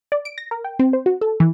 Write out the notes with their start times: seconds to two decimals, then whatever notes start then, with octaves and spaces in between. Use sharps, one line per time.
0.12 D5
0.25 D7
0.38 A#6
0.51 A#4
0.64 G5
0.79 C4
0.93 C5
1.06 F#4
1.21 A4
1.40 E3